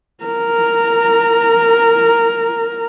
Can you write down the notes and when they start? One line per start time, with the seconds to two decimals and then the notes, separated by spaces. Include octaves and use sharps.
0.24 A#4 A#5